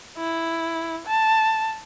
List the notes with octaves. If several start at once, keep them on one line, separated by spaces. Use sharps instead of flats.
E4
A5